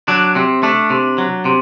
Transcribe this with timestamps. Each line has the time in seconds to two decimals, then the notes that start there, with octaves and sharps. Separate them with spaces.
0.08 F#3 D4
0.35 C3 C4
0.63 A3 D4
0.90 C3
1.18 F#3
1.45 C3